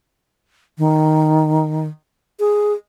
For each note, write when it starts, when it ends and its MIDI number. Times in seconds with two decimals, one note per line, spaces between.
0.78 1.88 51
2.40 2.73 68